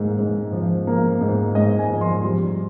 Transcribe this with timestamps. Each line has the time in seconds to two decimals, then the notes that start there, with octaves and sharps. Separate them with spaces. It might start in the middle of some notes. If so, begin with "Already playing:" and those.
Already playing: G#2 A#3
0.19 G#2
0.53 F3
0.87 A#3
1.21 G#2
1.55 G#2 D#5
1.79 G#5
1.90 F3
2.01 C6
2.24 G3